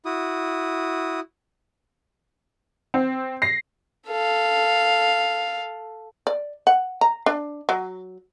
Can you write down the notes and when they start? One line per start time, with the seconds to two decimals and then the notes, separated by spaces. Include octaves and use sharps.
0.05 E4 F#4 D#6
2.94 C4
3.42 A#6 C7
4.08 A4 F5
6.27 D5
6.67 F#5
7.01 A#5
7.26 D4
7.69 F#3